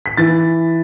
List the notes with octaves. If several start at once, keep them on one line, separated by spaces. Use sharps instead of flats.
B6
E3 A6